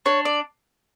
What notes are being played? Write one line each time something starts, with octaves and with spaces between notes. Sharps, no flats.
D4 C#5
D5